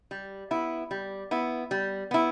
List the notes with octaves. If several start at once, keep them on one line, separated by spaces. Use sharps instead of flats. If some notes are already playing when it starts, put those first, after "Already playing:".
G3
B3 E4
G3
B3 E4
G3
B3 E4